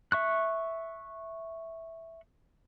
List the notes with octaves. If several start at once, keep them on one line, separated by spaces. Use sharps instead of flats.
E5 C#6 F#6